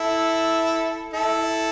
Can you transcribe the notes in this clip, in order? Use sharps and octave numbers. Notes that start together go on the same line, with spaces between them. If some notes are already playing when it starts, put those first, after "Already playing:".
Already playing: E4 A4
E4 A4